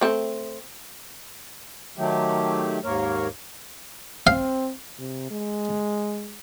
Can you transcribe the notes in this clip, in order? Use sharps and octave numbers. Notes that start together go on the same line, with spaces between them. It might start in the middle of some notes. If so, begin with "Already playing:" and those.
A3 C4
D#3 F#3 A3 G4
D#2 G#2 A#3 A#4 C#5
C4 F5
C3
G#3